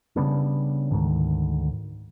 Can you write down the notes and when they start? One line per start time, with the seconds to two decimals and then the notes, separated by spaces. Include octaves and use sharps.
0.16 C#3 G3 B3 D4
0.91 D2 G#2 D#3